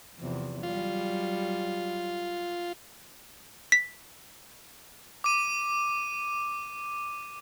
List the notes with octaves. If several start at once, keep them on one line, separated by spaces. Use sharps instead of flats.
E2 C3 F3
F#3 G3 F4
B6
D6 D#7